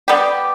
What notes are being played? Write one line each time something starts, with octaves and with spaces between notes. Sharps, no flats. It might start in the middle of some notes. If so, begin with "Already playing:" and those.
G3 B3 G4